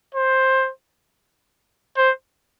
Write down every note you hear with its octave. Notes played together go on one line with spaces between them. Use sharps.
C5
C5